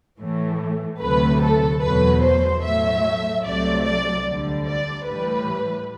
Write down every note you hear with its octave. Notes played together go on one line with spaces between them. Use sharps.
A2 E3 A3
D2 C3 F#3 A3 B4
A4
E2 B2 F#3 A3 B4
C5
A2 F#3 A3 E5
C2 C3 F#3 A3 D5
D5
D2 D3 G3
D5
A2 E3 G3 B4